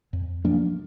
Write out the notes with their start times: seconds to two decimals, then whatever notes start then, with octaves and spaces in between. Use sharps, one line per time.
0.13 F2
0.45 F3 A#3 D4